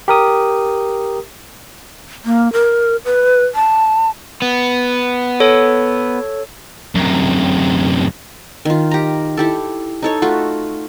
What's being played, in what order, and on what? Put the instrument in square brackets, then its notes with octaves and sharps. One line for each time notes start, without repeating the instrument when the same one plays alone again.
[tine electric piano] G4 A#4 D#6
[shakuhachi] A#3
A#4
B4
A5
[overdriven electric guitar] B3
[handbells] A4 C#5
[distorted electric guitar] F#2 C3
[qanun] D#3 F4
G4 A#5
E4 G4 A4
D#4 A4 C#5
A3 F4 F#4